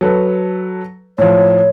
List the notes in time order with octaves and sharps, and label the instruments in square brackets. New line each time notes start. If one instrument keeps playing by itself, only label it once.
[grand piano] F#3 A4 B4
[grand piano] A2 F3 [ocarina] C#5